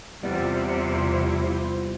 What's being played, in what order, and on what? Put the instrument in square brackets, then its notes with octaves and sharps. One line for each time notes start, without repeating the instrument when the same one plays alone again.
[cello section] E2 C3 [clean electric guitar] G3 B3 D5 [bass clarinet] E4 [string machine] F4 C5